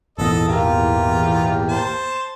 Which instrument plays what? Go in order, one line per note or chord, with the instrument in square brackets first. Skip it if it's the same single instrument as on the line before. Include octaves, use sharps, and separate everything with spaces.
[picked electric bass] G#1 A#2 B3 [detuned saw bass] E2 [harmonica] A4 D#5
[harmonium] A#3 G4 A#4 [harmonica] F4
[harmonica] C5 A5